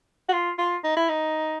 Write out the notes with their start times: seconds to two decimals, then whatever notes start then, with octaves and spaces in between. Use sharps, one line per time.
0.29 F#4
0.33 F4
0.58 F4
0.84 D#4
0.96 E4
1.09 D#4